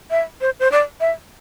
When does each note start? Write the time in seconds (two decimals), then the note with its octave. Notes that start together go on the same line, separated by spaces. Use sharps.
0.11 E5
0.41 C5
0.60 C5
0.72 D5
1.00 E5